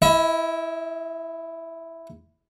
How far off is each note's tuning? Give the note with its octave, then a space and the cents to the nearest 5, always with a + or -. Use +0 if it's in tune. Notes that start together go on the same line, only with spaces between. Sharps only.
E4 +0 D#5 +45